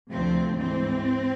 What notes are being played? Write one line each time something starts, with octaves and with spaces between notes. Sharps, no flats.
D2 C3 F3 A3 C4
G#2 E3 G#3 C4